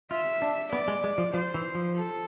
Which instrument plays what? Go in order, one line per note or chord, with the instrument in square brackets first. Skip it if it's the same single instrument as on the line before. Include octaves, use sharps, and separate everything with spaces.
[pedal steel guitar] F4 [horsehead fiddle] E5
[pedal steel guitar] D4
[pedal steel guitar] B3 [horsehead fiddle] D5
[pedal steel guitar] G#3
G#3
F3
[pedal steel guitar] F3 [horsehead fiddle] C5
[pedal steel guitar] E3
F3
[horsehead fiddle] A4